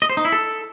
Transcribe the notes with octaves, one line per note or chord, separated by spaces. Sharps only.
D#5
C5
D#4
E4
A4